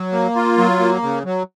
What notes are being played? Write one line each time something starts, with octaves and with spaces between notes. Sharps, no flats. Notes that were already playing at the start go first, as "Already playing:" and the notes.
Already playing: F#3
A#3
F4
F#3
A#3
C#3
F#3